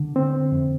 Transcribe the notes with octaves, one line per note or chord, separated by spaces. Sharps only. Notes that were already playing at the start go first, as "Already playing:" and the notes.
Already playing: D3
C4
F2